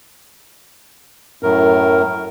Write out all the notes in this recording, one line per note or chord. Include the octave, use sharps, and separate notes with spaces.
F#2 A2 A#4